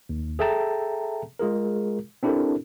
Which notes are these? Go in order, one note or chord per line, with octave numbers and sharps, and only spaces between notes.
D#2
G#4 A4 E5 G5 A5 A#5
G#3 F4 G#4 A#4
C4 D4 E4 G4 A4 A#4